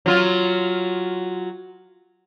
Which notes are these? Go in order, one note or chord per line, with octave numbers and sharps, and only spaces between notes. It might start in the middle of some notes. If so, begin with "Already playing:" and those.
F#3 F4